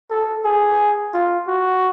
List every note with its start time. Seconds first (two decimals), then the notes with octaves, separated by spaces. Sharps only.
0.10 A4
0.44 G#4
1.14 F4
1.47 F#4